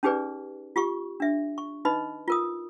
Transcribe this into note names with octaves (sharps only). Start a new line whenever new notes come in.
C#4 D#4 G4 G#4 B4 D5
F4 G4 C#6
D4 E5
C#6
D#4 B4 D#5 B5
F4 A#4 D#6